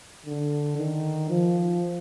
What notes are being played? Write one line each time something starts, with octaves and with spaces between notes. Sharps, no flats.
D3
D#3
F3